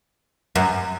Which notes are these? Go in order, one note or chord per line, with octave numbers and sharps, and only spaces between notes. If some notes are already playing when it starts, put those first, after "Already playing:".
F#2